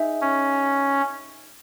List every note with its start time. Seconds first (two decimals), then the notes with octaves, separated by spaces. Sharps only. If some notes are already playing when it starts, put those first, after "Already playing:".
Already playing: D#4 G#4 E5
0.21 C#4